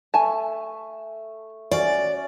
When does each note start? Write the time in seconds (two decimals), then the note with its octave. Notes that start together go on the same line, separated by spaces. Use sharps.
0.14 A3 G#5 A5
1.71 A3 C#4 F#4 D5